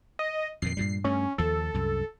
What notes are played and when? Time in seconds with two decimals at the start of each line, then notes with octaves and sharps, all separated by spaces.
0.19 D#5
0.62 F2 A#2 D#3 C7
0.77 G2 A#2 G3
1.04 G2 A3 C#4
1.38 D#2 F3 A4
1.74 C2 F#2